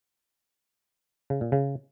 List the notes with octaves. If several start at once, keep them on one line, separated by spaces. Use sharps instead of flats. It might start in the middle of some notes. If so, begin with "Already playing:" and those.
C#3
A#2
C#3